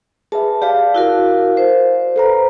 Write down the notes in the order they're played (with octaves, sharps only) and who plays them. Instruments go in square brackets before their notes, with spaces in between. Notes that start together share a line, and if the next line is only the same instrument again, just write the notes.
[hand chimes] G#4 B4 E5 [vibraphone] A5
[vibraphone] G4 [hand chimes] D5 F5 A5
[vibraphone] E4 F#4 A#4
C5
[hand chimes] A4 B4 A#5